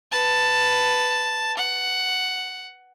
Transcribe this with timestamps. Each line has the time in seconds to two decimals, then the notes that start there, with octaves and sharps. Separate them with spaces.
0.12 B4 A5
1.58 F#5